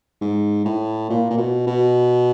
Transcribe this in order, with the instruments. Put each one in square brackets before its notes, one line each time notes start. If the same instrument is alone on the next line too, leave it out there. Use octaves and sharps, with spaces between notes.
[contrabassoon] G#2
A2
A#2
A#2
B2
B2